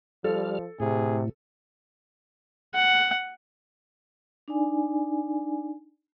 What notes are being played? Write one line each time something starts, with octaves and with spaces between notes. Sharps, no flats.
F3 G3 A4 F6
A2 C3 G#4
F#5
D4 D#4 D5 G#5